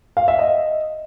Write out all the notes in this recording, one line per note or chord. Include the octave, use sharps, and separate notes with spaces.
F5
E5
D#5